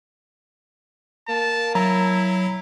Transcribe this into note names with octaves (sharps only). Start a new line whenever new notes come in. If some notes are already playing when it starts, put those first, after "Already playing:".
A#3 A5
F#3 E4 A#5